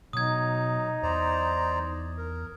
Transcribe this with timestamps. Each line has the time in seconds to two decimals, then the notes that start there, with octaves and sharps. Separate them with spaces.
0.13 B2 F#3 D#4 D#6 G#6
1.03 E2 C5 D5 A#5
2.18 A#4